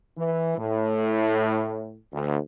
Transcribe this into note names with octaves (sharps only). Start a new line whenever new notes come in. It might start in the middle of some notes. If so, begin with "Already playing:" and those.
E3
A2
D2